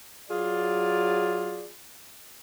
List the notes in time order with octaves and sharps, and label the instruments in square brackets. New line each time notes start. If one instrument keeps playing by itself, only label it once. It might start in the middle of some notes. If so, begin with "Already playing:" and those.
[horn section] F#3 F4 G#4 D5